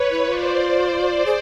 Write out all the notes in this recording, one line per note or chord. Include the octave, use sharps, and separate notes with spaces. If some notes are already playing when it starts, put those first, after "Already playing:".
Already playing: B4 C#5
E4
F4 C5 D5
G#4